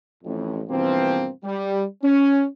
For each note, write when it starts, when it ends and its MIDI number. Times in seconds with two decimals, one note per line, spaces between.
0.24 0.62 33
0.24 0.62 41
0.24 0.62 45
0.69 1.28 43
0.69 1.28 47
0.69 1.28 52
0.69 1.28 53
0.69 1.28 58
0.69 1.28 60
1.44 1.83 55
2.03 2.46 61